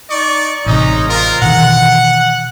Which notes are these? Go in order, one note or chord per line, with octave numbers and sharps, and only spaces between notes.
D#4 D5 C#6
A1 C3 G#3 C#4 D#4
C4 F4 A#4
B2 D#3 E3 F#5